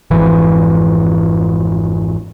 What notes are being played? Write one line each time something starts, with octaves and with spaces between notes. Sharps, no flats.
G#1 F2 E3